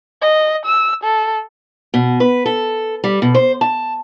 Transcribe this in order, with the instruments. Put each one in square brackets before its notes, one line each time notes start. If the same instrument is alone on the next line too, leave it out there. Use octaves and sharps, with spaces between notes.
[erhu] D#5
E6
A4
[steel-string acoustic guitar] B2
B4
A4
G3
B2
C5
A5